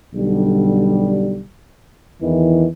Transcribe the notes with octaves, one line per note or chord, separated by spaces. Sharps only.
B1 D3 G3
E2 D#3 E3